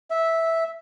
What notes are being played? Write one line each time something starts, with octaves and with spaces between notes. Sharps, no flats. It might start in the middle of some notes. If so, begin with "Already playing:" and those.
E5